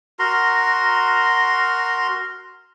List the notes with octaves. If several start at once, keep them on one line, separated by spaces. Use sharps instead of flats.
F#4 A#4 A#5 C6